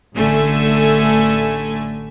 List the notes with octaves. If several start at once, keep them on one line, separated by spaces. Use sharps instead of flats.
A1 D3 A3 G#5